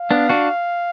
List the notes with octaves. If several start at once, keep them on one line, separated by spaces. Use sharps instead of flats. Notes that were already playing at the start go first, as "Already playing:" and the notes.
Already playing: F5
B3 D4
D4 F#4